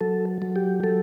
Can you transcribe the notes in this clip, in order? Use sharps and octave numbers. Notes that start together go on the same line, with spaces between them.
F#3 A4
F#3
G4
F#3 A4